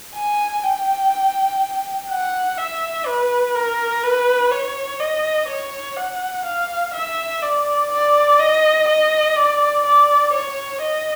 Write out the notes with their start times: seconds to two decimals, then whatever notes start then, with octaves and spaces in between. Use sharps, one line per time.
0.15 G#5
0.63 G5
2.09 F#5
2.58 E5
3.06 B4
3.55 A#4
4.04 B4
4.51 C#5
5.00 D#5
5.48 C#5
5.96 F#5
6.45 F5
6.94 E5
7.42 D5
7.91 D5
8.39 D#5
8.88 D#5
9.36 D5
9.84 D5
10.33 C#5
10.81 D#5